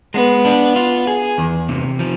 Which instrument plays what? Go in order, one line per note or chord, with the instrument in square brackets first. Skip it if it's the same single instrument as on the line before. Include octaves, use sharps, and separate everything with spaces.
[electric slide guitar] G#3 [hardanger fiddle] B3
[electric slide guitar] D4
F4
G#4
E2
C3
F3